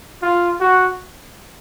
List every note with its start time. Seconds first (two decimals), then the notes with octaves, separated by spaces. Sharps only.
0.22 F4
0.60 F#4